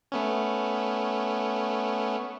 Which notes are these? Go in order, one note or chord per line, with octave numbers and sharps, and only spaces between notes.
A3 B3 C#4